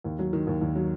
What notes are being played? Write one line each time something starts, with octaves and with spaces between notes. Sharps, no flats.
D#2
F#3
D#3
D#2
D#2
F#3